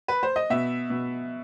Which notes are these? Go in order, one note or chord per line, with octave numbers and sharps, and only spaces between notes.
B4
C5
D#5
B2 E5
B2